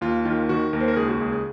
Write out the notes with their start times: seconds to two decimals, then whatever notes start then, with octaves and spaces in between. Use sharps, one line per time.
0.01 D#2 F4
0.25 D#3 F4
0.49 D#3 F#4
0.73 D#2 A#4
0.80 C5
0.88 A#4
0.96 C#2 G#4
1.08 F#4
1.20 C#2 G#4
1.32 G#4